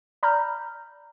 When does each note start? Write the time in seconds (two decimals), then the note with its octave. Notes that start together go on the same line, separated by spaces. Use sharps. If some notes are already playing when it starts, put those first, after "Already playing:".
0.23 D5 A#5 B5 F6 G6